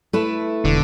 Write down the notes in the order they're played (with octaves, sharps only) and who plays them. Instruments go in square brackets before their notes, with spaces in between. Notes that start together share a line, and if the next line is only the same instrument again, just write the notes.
[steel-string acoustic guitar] A3 E4 B4
[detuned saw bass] E1 [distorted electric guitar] D3